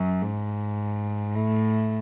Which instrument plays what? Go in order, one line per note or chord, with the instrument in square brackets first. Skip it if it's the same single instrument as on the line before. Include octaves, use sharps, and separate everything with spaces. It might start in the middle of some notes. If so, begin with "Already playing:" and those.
Already playing: [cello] F#2
G#2
A2